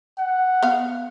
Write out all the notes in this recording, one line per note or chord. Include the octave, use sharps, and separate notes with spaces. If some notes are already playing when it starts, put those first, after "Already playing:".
F#5
B3 F5